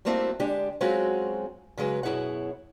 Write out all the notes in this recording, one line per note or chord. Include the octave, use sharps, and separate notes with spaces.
G3 A3 A#3 C4 E4 F#4
D3 G#3 D4 G4
F#3 G#3 C4 C#4 F4 F#4
C#3 F#3 G#3 B4
F#2 B2 E4 G#4 C#5 F#5